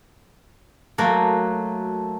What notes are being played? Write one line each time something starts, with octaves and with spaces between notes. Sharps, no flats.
F#3 A3 A#3 F#4 A4 A5